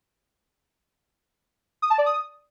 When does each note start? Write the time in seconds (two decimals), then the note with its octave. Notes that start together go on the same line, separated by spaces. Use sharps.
1.82 D#6
1.90 A5
1.98 D5
2.06 D#6